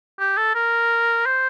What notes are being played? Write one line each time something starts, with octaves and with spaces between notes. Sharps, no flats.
G4
A4
A#4
C5